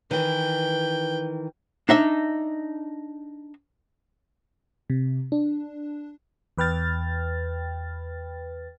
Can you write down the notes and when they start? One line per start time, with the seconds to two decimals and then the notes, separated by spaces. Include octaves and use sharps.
0.11 D#3 E3 B4 G5
1.89 D4 D#4 E5
4.90 C3
5.32 D4
6.58 E2 B4 G5 F6 A6